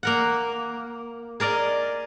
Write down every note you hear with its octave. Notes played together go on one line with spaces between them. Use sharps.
A#3 A#4 F#5
G#4 A#4 D5 D#5